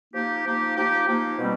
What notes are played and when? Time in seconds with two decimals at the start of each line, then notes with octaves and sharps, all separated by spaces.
0.14 F3 A#3 D#4 G4
0.46 F3 A#3 D#4 G4
0.76 F3 A#3 D#4 G4
1.08 F3 A#3 D#4 G4
1.39 B2 G3 C4